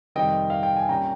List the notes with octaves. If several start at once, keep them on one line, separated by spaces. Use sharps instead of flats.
F2 C3 D#3 G3 C4 D#5 G5
F5
G5
G#5
C2 A#2 G3 C#4 G5 A#5